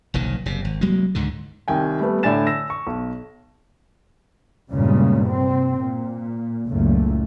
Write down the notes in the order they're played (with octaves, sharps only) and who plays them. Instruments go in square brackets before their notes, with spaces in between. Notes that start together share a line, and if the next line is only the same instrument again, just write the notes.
[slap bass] F1 B1 A#2 D#3
F#1 C3
G#1
C2 F#3 G#3 A#3
C#2 G#2 D3 D#3
[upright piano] C2 D#3 G5 G#5
G3 A3 B3
A2 D3 D5 G#5 A6 E7
E6 A#6 E7
C#6
B1
[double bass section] E2 G2 A#2 C#3 G3 G#3
C3 C4
A#2
F#1 C#2 A#2 A3